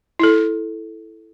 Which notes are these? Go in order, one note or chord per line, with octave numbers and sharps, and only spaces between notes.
E4 A4